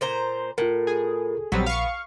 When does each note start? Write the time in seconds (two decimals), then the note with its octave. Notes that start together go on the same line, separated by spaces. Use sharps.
0.01 A#2 C5 A#5
0.58 A2 F4 A#4
0.87 G#4
1.52 A#1 F#3 G3 B3 C4
1.66 F5 C#6